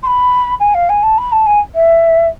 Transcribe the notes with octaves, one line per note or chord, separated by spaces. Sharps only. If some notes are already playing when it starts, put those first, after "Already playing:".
C6
B5
G#5
F5
G#5
A5
B5
A5
G#5
E5